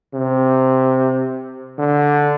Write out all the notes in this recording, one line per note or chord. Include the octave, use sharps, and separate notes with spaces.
C3
D3